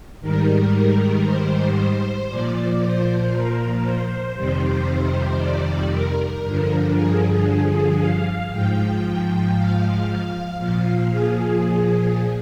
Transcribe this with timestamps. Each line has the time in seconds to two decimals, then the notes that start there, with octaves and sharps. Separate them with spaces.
0.21 G#2 D#3 G3 A#4
1.24 C5
2.28 A#2 F3 D5
2.80 C5
3.33 A#4
3.84 C5
4.35 F2 C3 D#3 G3 C5
5.40 D5
5.92 A#4
6.44 G2 D3 F3
6.96 G#4
7.99 F5
8.50 G#2 F3 G5
9.54 F5
10.58 A#2 F3
11.11 G#4